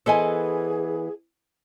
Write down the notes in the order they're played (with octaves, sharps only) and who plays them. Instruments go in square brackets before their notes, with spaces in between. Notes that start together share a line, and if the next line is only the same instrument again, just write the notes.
[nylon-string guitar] E3 B3 C5 [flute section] G#4 [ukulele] A4 D#5 G#5